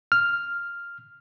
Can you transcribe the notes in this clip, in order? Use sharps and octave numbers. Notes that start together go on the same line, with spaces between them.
F6